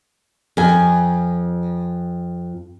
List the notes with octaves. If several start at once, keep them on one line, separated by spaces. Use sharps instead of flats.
F2 G#5